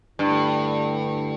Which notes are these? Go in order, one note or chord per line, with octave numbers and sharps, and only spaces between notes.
G2 D3 A3 E4